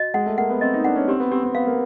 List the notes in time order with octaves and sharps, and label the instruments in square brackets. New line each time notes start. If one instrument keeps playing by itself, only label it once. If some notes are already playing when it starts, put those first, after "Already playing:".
Already playing: [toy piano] F#4 D#5
[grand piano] G#3 [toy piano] F#5
[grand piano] A3
[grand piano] A#3 [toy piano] F#5
[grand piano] B3
[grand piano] C4 [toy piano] D#5
[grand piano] D#4
[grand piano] D4 [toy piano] F#5
[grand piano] C#4
[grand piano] C4 [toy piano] G4
[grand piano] B3
[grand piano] C4 [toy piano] G4
[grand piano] C4
[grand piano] B3 [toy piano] F5
[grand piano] A#3